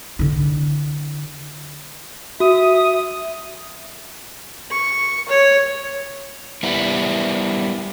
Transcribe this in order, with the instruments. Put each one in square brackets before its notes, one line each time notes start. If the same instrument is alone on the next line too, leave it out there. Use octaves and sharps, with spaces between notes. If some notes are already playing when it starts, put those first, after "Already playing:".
[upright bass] D3 E4
[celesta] F#4 [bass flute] E5 [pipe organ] D#6
[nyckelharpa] C#6
C#5
[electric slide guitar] G3 B3 E4